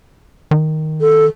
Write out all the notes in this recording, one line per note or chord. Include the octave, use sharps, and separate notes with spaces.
D#3
A4